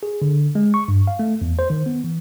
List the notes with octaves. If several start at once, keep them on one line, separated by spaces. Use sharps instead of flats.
G#4
D3
G#3
C#6
G2
F5
A3
E2
C5
D#3
B3
E3